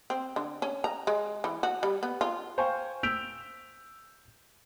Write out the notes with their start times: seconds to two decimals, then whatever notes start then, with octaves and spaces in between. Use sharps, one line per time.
0.10 C4
0.36 D3
0.62 C#4
0.84 A#5
1.07 G#3
1.44 E3
1.63 F#4
1.83 G3
2.03 B3
2.21 F4
2.58 C5 F5 G5 G#5 C#6
3.03 E6 G6 B6 D7 F7